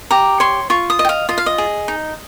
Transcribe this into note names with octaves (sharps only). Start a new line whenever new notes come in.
G4 A#5
C#5 C6
F4 C#6
D#6
D#5
G5
F5
F4 D#5
F5
D#5
G#4
D#4